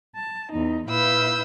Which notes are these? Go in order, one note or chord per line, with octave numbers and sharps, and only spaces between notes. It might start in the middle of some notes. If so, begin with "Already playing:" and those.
A5
E2 D#4
A#2 E4 B4 F5 E6 G6